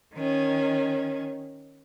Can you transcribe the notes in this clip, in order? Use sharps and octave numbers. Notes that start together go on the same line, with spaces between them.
D#3 C#4